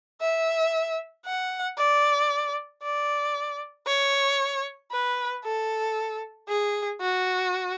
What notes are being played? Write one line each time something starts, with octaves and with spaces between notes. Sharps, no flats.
E5
F#5
D5
D5
C#5
B4
A4
G#4
F#4